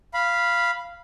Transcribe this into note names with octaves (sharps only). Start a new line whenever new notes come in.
F5 B5